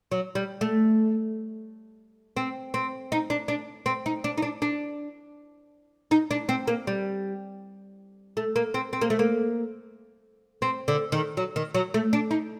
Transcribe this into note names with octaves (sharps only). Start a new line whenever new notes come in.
F#3
G3
A3
C4
C4
D#4
D4
D4
C4
D#4
D4
D#4
D4
D4
D#4
D4
C4
A#3
G3
A3
A#3
C4
C4
A#3
A3
A#3
C4
D3
D#3
F#3
D#3
F#3
A3
D4
D#4